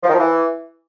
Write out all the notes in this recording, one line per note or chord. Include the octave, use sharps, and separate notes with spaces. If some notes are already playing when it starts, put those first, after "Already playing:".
F3
D#3
F3
E3